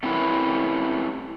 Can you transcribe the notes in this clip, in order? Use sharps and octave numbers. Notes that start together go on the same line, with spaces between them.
A3 C4 C#4 E4 A#4 B4